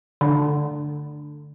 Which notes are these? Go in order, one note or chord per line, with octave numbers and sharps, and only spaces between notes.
D3